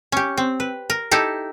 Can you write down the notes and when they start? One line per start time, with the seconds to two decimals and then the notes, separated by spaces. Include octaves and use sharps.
0.12 C#4 G4
0.37 C4
0.60 B4
0.90 A#4
1.11 D#4 E4 G4 A4